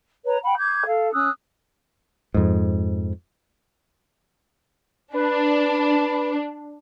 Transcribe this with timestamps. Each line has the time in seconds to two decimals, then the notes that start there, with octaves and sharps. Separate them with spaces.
0.25 B4 C#5 A#5
0.43 F#5 G5 B5
0.57 D6 G6 G#6
0.87 A4 F5
1.12 C#4 D#6 E6 F#6
2.34 F2 G#2
5.14 D4 B4